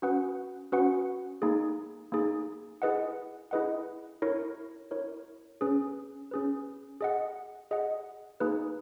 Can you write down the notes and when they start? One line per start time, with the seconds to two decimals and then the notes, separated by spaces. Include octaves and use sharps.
0.02 C#4 F#4 B4 F#5
0.72 C#4 F#4 B4 F#5
1.42 A#3 D#4 G#4
2.12 A#3 D#4 G#4
2.82 E4 G#4 B4 D#5 F#5
3.51 E4 G#4 B4 D#5 F#5
4.22 E4 A#4 C#5
4.91 E4 A#4 C#5
5.61 C#4 G#4 B4
6.31 C#4 G#4 B4
7.01 G#4 D#5 F#5
7.71 G#4 D#5 F#5
8.40 A#3 D#4 G#4 B4